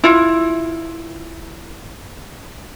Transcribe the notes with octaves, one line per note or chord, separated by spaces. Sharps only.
E4 F4